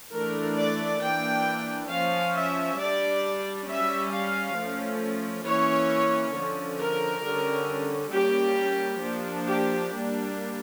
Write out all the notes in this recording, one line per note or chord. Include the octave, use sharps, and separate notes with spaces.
E3 A3 D4 A#4
D5
E3 A#3 D4 G5
F3 C#4 F5
E5
G3 D4 D5
G3 C#4 E5
F5
F3 A3 C#4
E3 A#3 C#4 C#5
D3 F3 C#4
A#4
D3 G3 C#4
G3 A#3 C#4 G4
F3 A#3 D4
G4
G3 A#3 D4